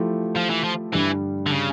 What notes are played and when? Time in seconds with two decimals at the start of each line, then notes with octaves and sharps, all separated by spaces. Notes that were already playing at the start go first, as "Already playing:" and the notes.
Already playing: F3 A3 E4 G4
0.36 F3
0.50 E3
0.64 F3
0.93 G2 D3 E3 G3
1.46 D3
1.51 C#3